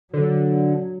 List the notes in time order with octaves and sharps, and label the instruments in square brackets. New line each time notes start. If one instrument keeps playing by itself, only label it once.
[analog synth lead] D3 [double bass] F#3